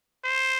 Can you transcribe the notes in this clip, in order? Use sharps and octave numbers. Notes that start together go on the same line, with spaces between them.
C5